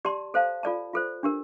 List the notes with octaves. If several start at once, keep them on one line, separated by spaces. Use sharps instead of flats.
G4 D5 A5 C6
A4 C5 F5 A5
F4 A4 D5 A5
F4 A4 C5
D4 G4 A#4